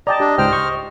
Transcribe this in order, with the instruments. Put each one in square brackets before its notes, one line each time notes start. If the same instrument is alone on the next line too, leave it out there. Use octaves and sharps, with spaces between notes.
[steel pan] D5 G5 A5 [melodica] D#5 [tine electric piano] A#5
[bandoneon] D4 [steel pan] G4
[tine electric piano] C#2 G#2 [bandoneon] C5 F6 [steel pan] G5
[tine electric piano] C#6